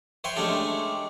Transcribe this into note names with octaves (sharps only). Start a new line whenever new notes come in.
B4 C#5 E5 G5 C6
G#3 A3 C#4 D4 G4 A4